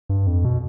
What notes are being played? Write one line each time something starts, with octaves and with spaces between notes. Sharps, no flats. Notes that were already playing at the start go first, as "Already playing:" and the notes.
G2
F2
B2